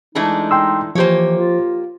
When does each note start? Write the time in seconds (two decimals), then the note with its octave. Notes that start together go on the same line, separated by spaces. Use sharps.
0.15 E3 G#3 A3 D4 D#4
0.51 G5 C6 E6
0.95 E3 F3 A#3 G4 C5 C#5
1.38 F4